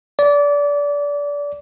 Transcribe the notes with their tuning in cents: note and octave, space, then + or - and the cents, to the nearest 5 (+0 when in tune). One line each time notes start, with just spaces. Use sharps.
D5 -25